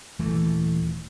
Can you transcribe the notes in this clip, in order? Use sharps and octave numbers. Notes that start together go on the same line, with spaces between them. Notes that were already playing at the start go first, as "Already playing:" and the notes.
D#1 E3 A3